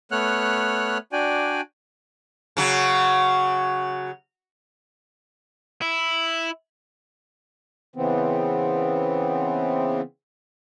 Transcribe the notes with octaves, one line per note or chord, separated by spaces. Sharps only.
A3 B3 C#5 F#5 F6 F#6
D4 F#4 D5 G5 G#5
C#3 F#3
E4
C#3 E3 B3 C4